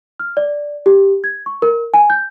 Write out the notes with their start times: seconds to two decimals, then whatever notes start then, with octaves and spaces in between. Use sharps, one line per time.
0.20 F6
0.37 D5
0.86 G4
1.24 G#6
1.46 C#6
1.62 A#4
1.94 G#5
2.10 G6